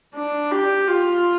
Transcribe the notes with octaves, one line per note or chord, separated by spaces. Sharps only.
D4
G4
F4